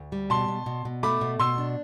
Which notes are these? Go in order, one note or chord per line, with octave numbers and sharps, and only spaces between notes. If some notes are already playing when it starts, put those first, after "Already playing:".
Already playing: D2
G3
B2 A5 C6
B2
B2
B2
A3 B5 D6
B2
B2 C6 E6
D4